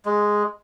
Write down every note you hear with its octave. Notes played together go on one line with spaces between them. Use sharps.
G#3